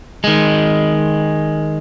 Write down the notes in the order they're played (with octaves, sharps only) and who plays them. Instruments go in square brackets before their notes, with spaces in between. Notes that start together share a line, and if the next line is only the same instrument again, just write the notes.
[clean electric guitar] D#3 G#3